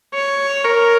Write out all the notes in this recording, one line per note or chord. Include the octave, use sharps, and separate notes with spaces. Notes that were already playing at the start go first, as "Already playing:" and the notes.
C#5
A#4